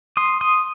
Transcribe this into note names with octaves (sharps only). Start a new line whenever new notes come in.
C6 D#6
C6 D#6